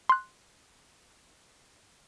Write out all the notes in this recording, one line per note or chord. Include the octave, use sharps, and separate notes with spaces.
C6 F#6